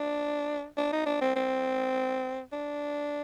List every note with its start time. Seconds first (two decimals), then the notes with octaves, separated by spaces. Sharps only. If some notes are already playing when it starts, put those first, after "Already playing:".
Already playing: D4
0.77 D4
0.92 D#4
1.06 D4
1.21 C4
1.36 C4
2.52 D4